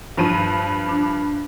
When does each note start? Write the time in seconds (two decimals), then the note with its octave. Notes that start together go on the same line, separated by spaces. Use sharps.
0.17 G2 F3 D#7
0.89 D4